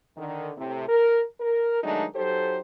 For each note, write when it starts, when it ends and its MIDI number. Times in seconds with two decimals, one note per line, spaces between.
0.17 0.51 50
0.17 0.51 51
0.57 0.88 45
0.57 0.88 48
0.89 1.20 70
1.40 1.81 70
1.83 2.04 51
1.83 2.04 54
1.83 2.04 56
1.83 2.04 57
1.83 2.04 62
1.83 2.04 63
2.15 2.59 54
2.15 2.59 63
2.15 2.59 67
2.15 2.59 69
2.15 2.59 72